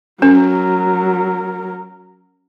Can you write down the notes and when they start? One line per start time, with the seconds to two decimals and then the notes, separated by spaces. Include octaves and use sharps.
0.22 F#3 C#4 A#4